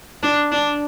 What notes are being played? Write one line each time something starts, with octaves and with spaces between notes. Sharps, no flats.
D4
D4